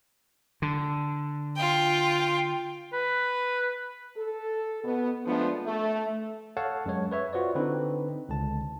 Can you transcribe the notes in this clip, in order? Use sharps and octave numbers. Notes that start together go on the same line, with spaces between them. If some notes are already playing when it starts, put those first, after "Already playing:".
D3
F4 G5
B4
A4
B2 B3
F3 G#3 A3 B3 D4
A3
A4 C#5 F5 F#5 A5
F#2 G#3 C#5
B4 C#5 E5
F4 F#4 B4 C5 D5
D3 C4 D#4 B4
C#2 D3 A5